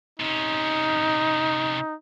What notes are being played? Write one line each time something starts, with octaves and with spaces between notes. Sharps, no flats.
C3 C#4 D#4